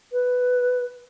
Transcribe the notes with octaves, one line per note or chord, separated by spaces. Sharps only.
B4